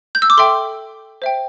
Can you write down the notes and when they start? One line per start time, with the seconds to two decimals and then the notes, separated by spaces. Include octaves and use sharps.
0.15 G6
0.22 E6
0.30 D6
0.37 A4 E5 G5 C6
1.22 C5 E5 G5